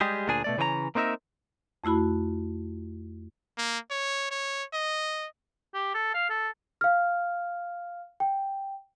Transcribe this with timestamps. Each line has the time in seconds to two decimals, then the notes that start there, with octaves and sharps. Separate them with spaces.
0.01 G3 G#3 G4 G#4
0.28 D2 A#2 D4 G#4 G#5
0.44 B2 A3 D5
0.58 C#3 E3 C#4 D#5 A#5
0.95 A#3 C4 D#4 A#4 E5
1.84 F2 A3 E4 F#4 B5
3.57 A#3
3.90 C#5
4.31 C#5
4.73 D#5
5.74 G4
5.95 A4
6.14 F5
6.30 A4
6.81 F5 F6
8.20 G5